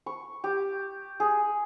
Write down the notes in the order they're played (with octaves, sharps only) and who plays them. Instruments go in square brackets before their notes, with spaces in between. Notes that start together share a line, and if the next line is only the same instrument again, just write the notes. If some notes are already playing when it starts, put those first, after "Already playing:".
[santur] C#6
G4
G#4